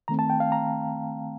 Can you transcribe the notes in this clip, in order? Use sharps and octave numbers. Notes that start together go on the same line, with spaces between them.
D#3 A3 C4 A#5
A5
G5
F5
A#5